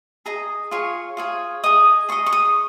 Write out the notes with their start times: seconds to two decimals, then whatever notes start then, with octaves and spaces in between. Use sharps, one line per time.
0.26 G#4 D#5 A#5
0.71 F4 G#4 C#5 C#6
1.17 F4 G#4 C#5
1.63 G#4 D#5 D#6
2.09 G#4 D#5 C#6
2.26 C#6
2.33 D#6